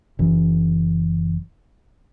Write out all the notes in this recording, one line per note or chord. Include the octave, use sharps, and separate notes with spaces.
F#1 E3